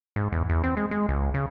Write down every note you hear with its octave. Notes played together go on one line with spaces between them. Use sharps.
G#2
E2
E2
C4
G#3
G#3
C#2
C#3